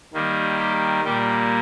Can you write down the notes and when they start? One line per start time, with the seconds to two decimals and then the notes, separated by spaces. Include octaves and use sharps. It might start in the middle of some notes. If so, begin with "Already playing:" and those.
0.14 D#3 G3 A#3
0.59 G4
1.04 A#2 G3 A#3 G4